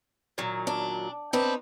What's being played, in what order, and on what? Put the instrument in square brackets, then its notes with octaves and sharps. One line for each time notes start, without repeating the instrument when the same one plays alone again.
[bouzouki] A#2 D#3 F#3
[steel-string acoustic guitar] D4
[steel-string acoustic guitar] C4 D4 B4 [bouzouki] D#4